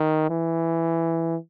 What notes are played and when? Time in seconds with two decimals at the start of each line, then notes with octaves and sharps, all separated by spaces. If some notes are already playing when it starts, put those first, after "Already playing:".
Already playing: D#3
0.30 E3